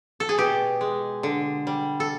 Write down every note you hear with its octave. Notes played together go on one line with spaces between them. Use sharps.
A4
G#4
B2 G4
G#3
D3
G3
A4